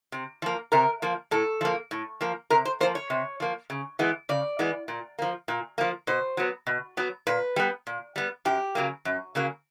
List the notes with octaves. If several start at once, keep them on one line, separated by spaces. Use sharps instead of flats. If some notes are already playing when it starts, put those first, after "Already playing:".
C3
F3 A#3
C3 A#4
F3 A#3
A2 A4
F3 A#3
A2
F3 A#3
C3 A#4
C5
F3 A#3 C5
C#5
C3
F3 A#3
C#3
E3 G#3 B3
C#3 D5
E3 G#3 B3
A#2
F3 A#3
A#2
F3 A#3
B2 C5
F#3 B3
B2
F#3 B3
A#2 B4
G3 B3
A#2
G3 B3
F#2 G4
C#3 F#3 A#3
F#2
C#3 F#3 A#3